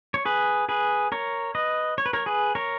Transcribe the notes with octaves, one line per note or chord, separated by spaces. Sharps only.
C#5
G#4 B4
G#4 B4
A#4 C#5
B4 D#5
C#5
B4
A#4 C#5
G#4 B4
A#4 C#5